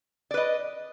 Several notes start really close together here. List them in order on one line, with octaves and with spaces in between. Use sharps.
D5 B4 D#5